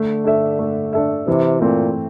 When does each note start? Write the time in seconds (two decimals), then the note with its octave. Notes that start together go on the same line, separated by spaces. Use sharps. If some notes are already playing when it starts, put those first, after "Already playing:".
Already playing: D3 A3
0.24 D4 A4 E5
0.59 A3
0.93 D4 A4 E5
1.27 C3 E3
1.61 A#2 A3 C4